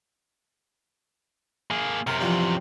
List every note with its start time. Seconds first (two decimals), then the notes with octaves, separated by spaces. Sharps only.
1.71 A#3 G#4
2.07 F#2 C3 A#4
2.20 E3 F3 G3